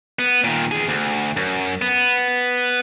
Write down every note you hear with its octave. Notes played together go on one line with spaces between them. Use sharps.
B3
A#2 D#3
E2 G#4
D2
F#2
B3